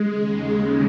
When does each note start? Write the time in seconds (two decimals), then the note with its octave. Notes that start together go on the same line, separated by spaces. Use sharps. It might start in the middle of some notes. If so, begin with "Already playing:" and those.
Already playing: G#3
0.10 D#2 C#3